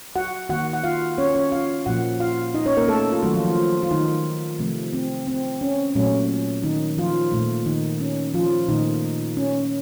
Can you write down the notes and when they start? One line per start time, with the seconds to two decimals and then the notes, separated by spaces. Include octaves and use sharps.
0.16 F#4 F#5
0.49 D#3 A#3 F#4 F#5
0.73 F#5
0.84 F4 F5
1.18 C#4 C#5
1.35 C#4 C#5
1.52 F4 F5
1.86 A#2 F3 A#3 F#4 F#5
2.20 F4 F5
2.54 D#4 D#5
2.66 C#4 C#5
2.77 A#3 A#4
2.88 A3 A4
3.12 F4
3.22 D#3 F#3 A3 F#4
3.34 F3 F4
3.45 F3 F4
3.83 F4
3.91 D#3 D#4
4.59 C3 F3 A3
4.93 C4
5.27 C4
5.61 C#4
5.95 A#2 F#3 A3 C#4
6.63 D#3 D#4
6.97 F3 F4
7.32 A#2 A3
7.66 D#3 D#4
8.00 C#4
8.34 F3 F4
8.68 A#2 D#3 A3 D#4
9.37 C#4